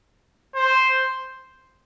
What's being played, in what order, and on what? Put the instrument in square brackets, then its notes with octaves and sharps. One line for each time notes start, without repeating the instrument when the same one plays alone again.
[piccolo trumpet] C5